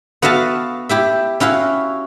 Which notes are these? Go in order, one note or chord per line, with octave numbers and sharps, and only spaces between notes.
B3 F#4 E5 F5 A5
E4 G4 E5
C#4 E4 F#4 F5